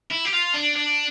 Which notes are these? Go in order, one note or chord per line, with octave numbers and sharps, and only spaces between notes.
E4
G4
F4
D4
D4